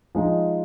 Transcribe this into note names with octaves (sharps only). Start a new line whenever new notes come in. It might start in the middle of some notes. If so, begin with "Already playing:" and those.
F3 G#3 D#4